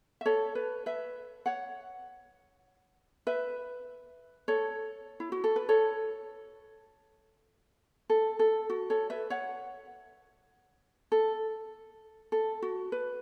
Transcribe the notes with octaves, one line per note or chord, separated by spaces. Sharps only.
E5
A4 C#5
B4
B4 E5
C#5 F#5
B4 E5
A4 C#5
E4
F#4
A4
B4
A4 C#5
A4
A4
F#4
A4 C#5
B4 E5
C#5 F#5
A4
A4
F#4
B4